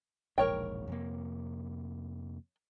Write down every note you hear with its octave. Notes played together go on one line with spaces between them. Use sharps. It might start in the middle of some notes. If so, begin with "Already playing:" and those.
E1 A#1 G#2 A#4 C#5 G5
F2 C3 A#3